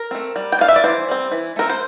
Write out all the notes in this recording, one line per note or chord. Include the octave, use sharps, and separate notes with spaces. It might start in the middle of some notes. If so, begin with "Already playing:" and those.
Already playing: A#4
A3 C4
G3
G5
D4 F5
E5
D5
E3 C5
G3 C4
E3
A3 C4 A#4
C5